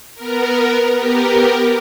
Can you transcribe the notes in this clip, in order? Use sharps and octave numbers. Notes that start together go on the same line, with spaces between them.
B3 A#4
B3 G4 A#4